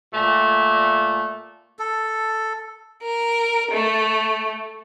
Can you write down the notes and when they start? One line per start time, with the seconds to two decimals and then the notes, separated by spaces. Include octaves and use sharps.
0.11 A#2 A3
1.79 A4
3.02 A#4
3.71 A3